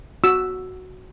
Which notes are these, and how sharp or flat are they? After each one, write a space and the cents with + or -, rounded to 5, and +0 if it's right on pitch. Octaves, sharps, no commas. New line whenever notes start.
F#4 +0 E6 +0